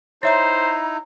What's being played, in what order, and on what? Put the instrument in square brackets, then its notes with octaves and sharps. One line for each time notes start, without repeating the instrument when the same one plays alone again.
[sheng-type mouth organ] D#4 E4 [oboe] C5 [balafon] C#5 E5 C6 [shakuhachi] A#5